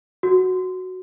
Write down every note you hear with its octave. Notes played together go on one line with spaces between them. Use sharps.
F#4